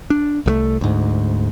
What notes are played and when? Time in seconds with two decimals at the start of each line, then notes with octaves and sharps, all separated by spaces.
0.10 D4
0.46 C2 F#3 A3
0.81 D2 G#2